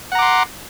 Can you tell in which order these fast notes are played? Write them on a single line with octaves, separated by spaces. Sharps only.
F#5 A#5 D6 C6